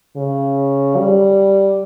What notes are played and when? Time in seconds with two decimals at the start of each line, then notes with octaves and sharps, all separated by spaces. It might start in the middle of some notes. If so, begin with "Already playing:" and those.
0.17 C#3
0.97 G3